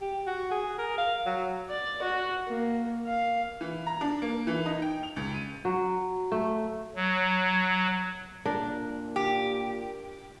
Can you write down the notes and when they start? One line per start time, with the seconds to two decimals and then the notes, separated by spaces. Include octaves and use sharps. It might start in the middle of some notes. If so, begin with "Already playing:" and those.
0.01 G4
0.27 F#4
0.51 G#4
0.78 A#4
0.98 F5
1.26 F#3
1.69 D5
2.02 F#4
2.48 A#3
3.07 F5
3.61 E3
3.87 A#5
4.01 D4
4.22 A#3
4.47 E3
4.66 D#4
4.82 G5
5.03 F7
5.16 C#2
5.34 D#7
5.65 F#3
6.32 A3
6.96 F#3
8.46 A#2 D4 A#4
9.16 G4